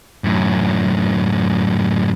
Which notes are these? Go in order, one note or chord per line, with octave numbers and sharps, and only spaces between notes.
F#2 A2